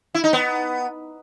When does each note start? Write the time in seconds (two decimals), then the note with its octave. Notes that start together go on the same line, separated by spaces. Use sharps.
0.14 E4
0.24 D#4
0.33 B3